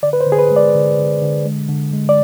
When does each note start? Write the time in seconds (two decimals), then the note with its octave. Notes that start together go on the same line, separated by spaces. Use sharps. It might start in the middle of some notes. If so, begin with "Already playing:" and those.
0.03 D3 D5
0.13 B4
0.21 C5
0.26 D3
0.32 G#4
0.39 B4
0.51 G#3
0.56 D5
0.75 D3
0.98 D3
1.22 D3
1.46 G#3
1.69 D3
1.93 G#3
2.09 D5